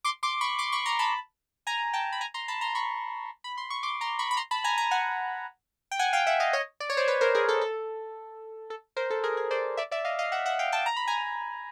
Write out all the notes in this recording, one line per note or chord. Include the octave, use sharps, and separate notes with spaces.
C6 D6
C6 D6
B5 C#6
C6 D6
B5 C#6
A#5 C6
A5 B5
G#5 A#5
G5 A5
B5
G#5 A#5
A#5 C6
A5 B5
A#5 C6
B5 C#6
B5
C6
C#6
C6 D6
A#5 C6
B5 C#6
B5
A#5 C6
A5 B5
G#5 A#5
G#5 A#5
F#5 G#5
G5
F#5 G#5
F5 G5
E5 F#5
D#5 F5
C#5 D#5
D5
C#5
C5 D5
B4 C#5
A#4 C5
G#4 A#4
A4
A4
A4
A#4 C5
A4
G#4 A#4
G#4
C5 D5
D5 E5
D5 E5
D#5 F5
D#5 F5
E5 F#5
E5 F#5
F5 G5
G5 A5
A#5
B5
G#5 A#5